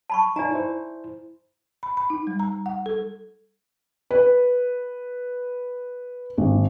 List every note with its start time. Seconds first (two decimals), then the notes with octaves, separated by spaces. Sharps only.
0.10 A5 B5 C#6
0.36 D#4 C#5 D5 G#5 A#5
0.51 E4 C5
1.83 B5
1.97 B5
2.10 D#4
2.27 G3
2.40 A#5
2.66 F#5
2.86 A4
4.11 B4
6.38 G#1